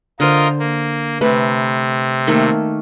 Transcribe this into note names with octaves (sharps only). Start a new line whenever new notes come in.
D3 F4 A#4 C5 D#5
A#3
C3 A3 B4
D#3 A3 A#3